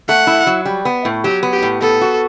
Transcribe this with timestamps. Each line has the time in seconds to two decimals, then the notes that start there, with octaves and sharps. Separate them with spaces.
0.09 A3 F#5
0.27 E4
0.47 F#3
0.65 G3
0.85 B3
1.05 A2
1.24 F#3 G4
1.43 B3
1.53 G4
1.62 A2
1.82 B3 A4
2.02 F#4